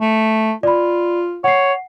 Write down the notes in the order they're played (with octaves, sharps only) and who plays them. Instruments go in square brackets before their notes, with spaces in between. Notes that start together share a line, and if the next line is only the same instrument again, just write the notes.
[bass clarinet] A3
[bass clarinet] F4 [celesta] D5 B5
[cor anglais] C#5 [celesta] F#5 C7